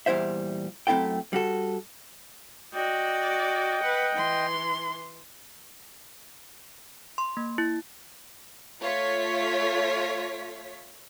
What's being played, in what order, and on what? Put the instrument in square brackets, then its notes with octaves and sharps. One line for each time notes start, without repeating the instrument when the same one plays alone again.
[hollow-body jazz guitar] E2 A#2 G3 E4 C5 E5
F#2 A3 C4 E4 A4 G5
G3 F#4 A4
[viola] F#4 D5 [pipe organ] D#5 G5
[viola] B4 F#5
E3 C6
[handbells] C6
A#3
E4
[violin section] A3 F4 C#5 B6